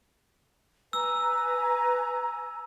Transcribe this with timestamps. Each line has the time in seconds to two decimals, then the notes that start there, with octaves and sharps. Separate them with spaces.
0.93 B4 G#5 A#5 E6